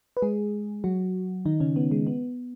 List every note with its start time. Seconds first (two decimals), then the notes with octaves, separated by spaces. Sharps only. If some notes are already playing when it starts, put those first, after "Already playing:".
0.17 B4
0.22 G#3 G#4
0.84 F#3 F#4
1.45 D#3 D#4
1.60 C#3 C#4
1.76 B3
1.91 G#3
2.07 B3